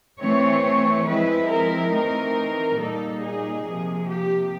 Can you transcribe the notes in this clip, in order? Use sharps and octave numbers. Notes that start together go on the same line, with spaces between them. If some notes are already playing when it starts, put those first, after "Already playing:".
E3 A3 C4 C#5
F3 G#3 C4 E4 B4
A#4
E3 A3 C4 D#4
A#2 G3 A#3 D#4 A4
G#4
C3 F3 A#3
G4